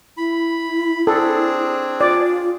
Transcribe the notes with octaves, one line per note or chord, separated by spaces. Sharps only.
E4 B5
C4 D4 G#4 A4
F4 D5